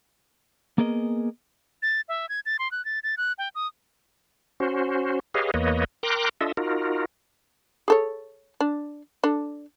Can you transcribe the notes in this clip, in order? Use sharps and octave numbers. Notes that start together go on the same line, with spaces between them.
A#3 B3 G#4 A#4 D#5
A6
E5
G#6
A6
C6
F#6
A6
A6
F#6
G5
D#6
C#4 F#4 C5
G4 G#4 B4 C#5 D#5 F5
E2 A#3 B4 C#5 D#5
A#4 G5 A#5 C6 D6 F#6
D4 F4 A4 D#5 E5
D#4 F4 F#4 A#4
G#4 A4 C#5
D4
D4 A4